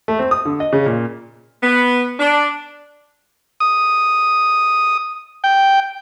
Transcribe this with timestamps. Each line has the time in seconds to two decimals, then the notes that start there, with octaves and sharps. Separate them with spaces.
0.08 A3
0.19 C4
0.31 D#6
0.45 D3
0.60 D#5
0.73 C#3
0.86 A#2
1.63 B3
2.20 D4
3.60 D#6
5.44 G5